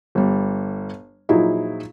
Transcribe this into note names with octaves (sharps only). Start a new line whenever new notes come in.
G1 G3
A#2 F3 F#3 D#4 E4 G#4